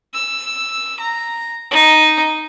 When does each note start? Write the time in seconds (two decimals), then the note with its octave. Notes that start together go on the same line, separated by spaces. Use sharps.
0.14 E6
1.00 A#5
1.71 D#4